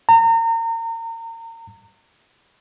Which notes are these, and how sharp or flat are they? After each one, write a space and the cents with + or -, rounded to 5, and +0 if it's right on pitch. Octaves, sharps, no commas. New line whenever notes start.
A#5 -35